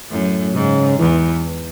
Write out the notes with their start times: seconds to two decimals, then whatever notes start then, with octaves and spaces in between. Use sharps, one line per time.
0.11 F#2 A2
0.54 G#2 C#3
0.99 E2 E3